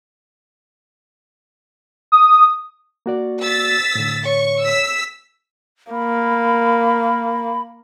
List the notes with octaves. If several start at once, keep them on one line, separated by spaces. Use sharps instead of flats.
D#6
A#3 F#4 D5
E6 A6 B6
A2 D3
C#5 C#6
E6 B6
A#3 B5